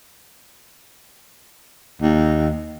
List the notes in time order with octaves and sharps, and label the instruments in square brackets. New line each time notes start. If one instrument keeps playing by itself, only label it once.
[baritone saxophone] D#2